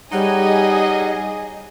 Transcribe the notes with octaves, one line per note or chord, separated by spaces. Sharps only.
G3 D#4 G#4 C#5 D#5 F#5